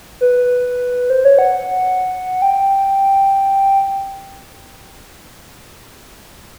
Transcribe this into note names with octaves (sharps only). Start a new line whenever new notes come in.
B4
C5
C#5
F#5
G5